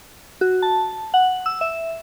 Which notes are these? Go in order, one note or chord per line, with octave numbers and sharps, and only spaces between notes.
F#4
A5
F#5
E6
E5